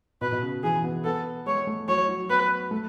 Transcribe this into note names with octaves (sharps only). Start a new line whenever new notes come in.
B2 B4
B2
C#3
E3 G#4
B3
B3 A4
G#3 C#5
A3
F#3 C#5
F#3
B3 B4
A3